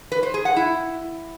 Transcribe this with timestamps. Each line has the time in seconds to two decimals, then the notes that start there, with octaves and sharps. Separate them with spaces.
0.12 B4
0.23 C5
0.34 G#4
0.45 F#5
0.56 E4